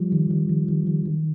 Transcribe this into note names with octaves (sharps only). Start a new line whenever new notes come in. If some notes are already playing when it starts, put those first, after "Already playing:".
Already playing: F3 G3
D#3
D#3
D#3
D#3
D#3
D#3